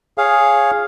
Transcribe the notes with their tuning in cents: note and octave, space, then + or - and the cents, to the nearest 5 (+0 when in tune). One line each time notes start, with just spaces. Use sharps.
G#4 +0 C#5 +0 F5 +0